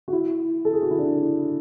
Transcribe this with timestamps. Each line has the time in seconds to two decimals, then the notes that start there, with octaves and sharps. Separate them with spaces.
0.08 F#4
0.13 E4
0.65 A4
0.73 G#4
0.82 F#4
0.91 E4
0.99 D4